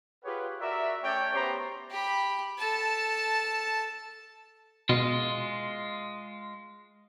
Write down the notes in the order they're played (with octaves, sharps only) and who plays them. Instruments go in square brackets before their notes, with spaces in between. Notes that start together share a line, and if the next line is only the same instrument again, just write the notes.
[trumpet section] F4 G4 G#4 B4 C#5 F#5
F#4 A#4 D5 E5
A3 C#4 C#5 D5 G5
B3 G4 C5 C#5 A#5 C6
[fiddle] G4 B5
A4 A5
[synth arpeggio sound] B2 [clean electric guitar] G#3 F4